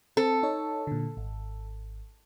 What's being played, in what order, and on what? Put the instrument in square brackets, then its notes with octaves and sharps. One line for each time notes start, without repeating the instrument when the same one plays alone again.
[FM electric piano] C4 [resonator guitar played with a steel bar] A4
[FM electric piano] D#4 C#5
A#2 D3
G#1